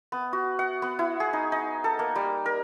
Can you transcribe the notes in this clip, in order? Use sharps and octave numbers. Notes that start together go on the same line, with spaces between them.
B3
F#4
F#5
B3
E4
G#4
D#4
D#4
A4
A#3
G3
A#4